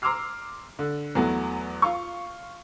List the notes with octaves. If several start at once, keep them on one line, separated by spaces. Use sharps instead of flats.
A#5 C6 D6 E6 F6 C7
D3
E2 F#3 A3 B3
F4 F5 C#6